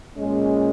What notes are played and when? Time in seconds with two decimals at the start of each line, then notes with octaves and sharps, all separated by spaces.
0.17 A#2 G#3 C#4